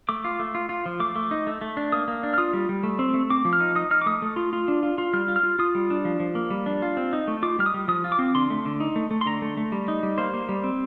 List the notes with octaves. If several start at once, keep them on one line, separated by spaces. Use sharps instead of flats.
A3 D6
F4
A3
F4
F4
F3
A3 D6
A3
D#4
A3
A3
D4
A#3 D#6
A#3
D4
F6
F4 D#6
G3
G3
A3
C4
A3
C4 D6
F3
F6
D#4
D#4 D#6
D#4 F6
D6
A3 D#6
A3
F4
F4
D4
F4
F4
G3 F6
F4
F6
F4
F4 D#6
G3
D4
F3
F3
A#3
G3
D4
F4
C4
D#4
A3
F4 D6
G3 F6
D#6
G3
F3 D#6
F4
D6
C4
D3 C6
A3
D3
D#4
A3
A3
C6
D3 A#5
A3
A3
G3
D#4
G3
A#3 C5
A#3
G3
C4